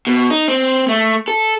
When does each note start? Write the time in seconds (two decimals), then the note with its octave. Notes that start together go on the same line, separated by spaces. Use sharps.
0.07 B2
0.30 D#4
0.48 C4
0.89 A3
1.28 A4